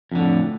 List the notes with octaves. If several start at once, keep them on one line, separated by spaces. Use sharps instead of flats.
F2 A2 D3